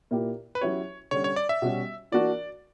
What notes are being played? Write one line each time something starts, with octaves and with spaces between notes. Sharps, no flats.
A#2 A#3 E4 G4
B4
F#3 C#4 E4 G4 C#5
D3 G3 C#4 C#5
C#5
D5
E5
B2 G3 C#4 F#4
E3 A#3 D4 F#4 D5